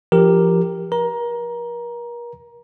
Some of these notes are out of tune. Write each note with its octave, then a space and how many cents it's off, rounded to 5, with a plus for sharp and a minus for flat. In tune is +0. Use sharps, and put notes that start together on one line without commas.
F3 -20 G4 +0 A#4 +0
A#4 +40 A#5 +15